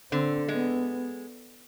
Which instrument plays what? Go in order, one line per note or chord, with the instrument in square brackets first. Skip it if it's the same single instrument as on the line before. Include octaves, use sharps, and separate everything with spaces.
[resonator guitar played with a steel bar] D3 [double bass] C4
[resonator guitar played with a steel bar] G#3 [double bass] B3